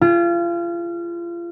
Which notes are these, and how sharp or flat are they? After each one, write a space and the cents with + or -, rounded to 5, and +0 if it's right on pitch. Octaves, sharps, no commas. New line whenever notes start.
F4 -30 G#4 +0